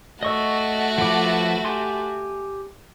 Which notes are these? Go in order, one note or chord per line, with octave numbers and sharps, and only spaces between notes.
A3 F#4 D#5 C#6 E6
F3 B4 D6
G4 G#5 C6